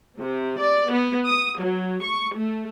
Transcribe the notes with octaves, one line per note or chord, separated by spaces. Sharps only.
C3
D5
B3
D#6
F#3
C#6
A3